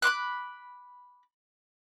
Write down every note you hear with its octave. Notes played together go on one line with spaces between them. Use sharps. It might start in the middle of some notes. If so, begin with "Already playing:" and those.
B5 C6 D6 F#6